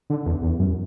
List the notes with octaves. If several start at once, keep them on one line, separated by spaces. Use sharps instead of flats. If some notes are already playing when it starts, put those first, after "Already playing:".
D3
E2
E2
F#2